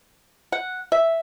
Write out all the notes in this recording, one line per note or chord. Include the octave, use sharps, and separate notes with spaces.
F#5
E5